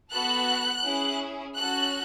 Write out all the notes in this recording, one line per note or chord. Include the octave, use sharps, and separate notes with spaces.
B3 F#4 A4 F#6
C#4 E4 G#4
C#4 F#4 A4 F#6